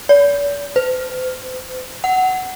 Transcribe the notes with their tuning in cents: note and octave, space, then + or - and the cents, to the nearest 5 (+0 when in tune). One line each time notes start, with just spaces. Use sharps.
D5 -45
C5 -45
F#5 +10